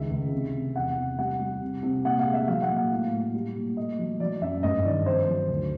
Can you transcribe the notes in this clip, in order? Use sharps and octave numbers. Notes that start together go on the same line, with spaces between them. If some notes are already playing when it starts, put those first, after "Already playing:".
Already playing: C#2 D#3 E5
C#2
C3
C3
E2 F#5
C3
G3 F#5
G3
C3
C3
A#2 F#5
F5
G#3
E5
F#3 F5
F#5
A#2
F5
A2
A2
G3
A#2
A3 D#5
F#3
F#3 D5
F#2 E5
G2 D#5
D#3 D5
F2 C5
F#3
D2